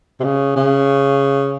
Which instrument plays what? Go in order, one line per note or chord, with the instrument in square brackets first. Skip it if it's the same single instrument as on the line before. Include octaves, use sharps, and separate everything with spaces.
[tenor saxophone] C3
C#3
C#3